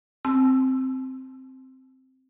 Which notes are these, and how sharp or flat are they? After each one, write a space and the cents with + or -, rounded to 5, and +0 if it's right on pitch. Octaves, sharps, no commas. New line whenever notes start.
C4 +0 A5 -40 E6 +10